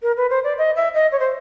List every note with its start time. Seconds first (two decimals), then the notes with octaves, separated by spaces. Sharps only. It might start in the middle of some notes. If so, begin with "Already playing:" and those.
0.02 A#4
0.17 B4
0.30 C5
0.44 D5
0.58 D#5
0.76 E5
0.94 D#5
1.12 C#5
1.20 C5